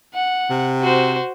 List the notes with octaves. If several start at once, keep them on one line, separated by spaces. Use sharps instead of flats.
F#5
C3
F#4 C5